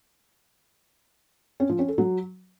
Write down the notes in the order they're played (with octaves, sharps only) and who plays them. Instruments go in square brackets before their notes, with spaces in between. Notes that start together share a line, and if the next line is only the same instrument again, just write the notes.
[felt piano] C#4
F3
C#4
A4
F#3